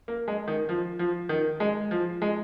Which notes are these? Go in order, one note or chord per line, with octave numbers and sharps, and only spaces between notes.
A#3
G#3
D#3
F3
F3
D#3
G#3
F3
G#3